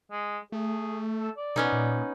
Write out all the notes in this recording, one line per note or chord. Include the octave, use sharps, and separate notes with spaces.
G#3
A3 G#4
A4
D5
B2 B3 C#4 D#4
A#2